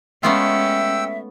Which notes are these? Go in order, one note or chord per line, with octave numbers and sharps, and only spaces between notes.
G#3 A3 B3 C#4 F4 E5 G5 E6